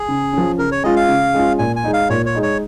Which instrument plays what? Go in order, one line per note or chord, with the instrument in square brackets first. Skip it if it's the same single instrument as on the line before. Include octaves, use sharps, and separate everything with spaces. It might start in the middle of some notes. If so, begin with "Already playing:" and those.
Already playing: [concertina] G#4
[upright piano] C#3
F3 C#4
[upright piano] C#3 [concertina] A#4
[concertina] C#5
[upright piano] G#3 C#4 F4 [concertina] D#5
[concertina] F5
[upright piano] C#3
G#3 C#4 F4
[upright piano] A#2 [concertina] G#5
[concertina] G#5
[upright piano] G#3 D#4
[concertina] F5
[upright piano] A#2 [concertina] C#5
[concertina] C#5
[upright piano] G#3 D#4
[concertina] C#5